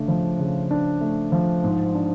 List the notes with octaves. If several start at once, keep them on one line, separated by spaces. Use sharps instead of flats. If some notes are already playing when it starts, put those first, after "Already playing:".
Already playing: C#3 A3 D4
F3
C#3
D4
A3
F3
G#2
D4